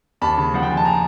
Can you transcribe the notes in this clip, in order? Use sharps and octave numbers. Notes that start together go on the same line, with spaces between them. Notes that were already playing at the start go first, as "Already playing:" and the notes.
D#2 A5 B5
C#3
F3 F#5
G5
C#3 G#5
A5
G#5 A#5